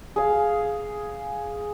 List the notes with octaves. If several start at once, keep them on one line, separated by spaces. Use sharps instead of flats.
G#4 F5